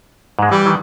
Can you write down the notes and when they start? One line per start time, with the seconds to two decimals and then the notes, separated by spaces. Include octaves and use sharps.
0.39 G#2 G#3
0.51 E3 G3
0.66 D#3 E3